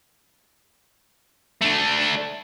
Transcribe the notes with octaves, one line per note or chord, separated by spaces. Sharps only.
A3 D4